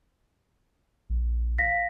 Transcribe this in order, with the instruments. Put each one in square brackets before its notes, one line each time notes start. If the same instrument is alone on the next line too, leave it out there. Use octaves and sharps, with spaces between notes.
[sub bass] A#1
[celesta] F5 A#6 B6